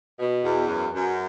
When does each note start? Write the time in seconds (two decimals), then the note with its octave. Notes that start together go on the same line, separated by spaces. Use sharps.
0.18 B2
0.43 E2
0.68 F#2
0.91 F#2